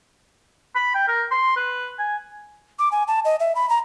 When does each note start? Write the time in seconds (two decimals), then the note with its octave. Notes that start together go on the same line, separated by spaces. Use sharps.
0.76 B5
0.95 G5
1.08 A#4
1.31 C6
1.56 B4
1.99 G#5
2.79 D6
2.92 G#5
3.08 A5
3.25 D#5
3.40 E5
3.55 B5
3.69 A#5